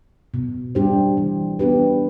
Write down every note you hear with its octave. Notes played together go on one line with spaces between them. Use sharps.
B2
G3 D4 G4 C5
E3
B3 D4 G4 B4